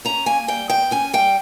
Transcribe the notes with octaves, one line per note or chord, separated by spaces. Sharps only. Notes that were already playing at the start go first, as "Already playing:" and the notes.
C#4 A#5
A#3 G#5
G3 G5
B2 G5
C#4 G#5
G3 G5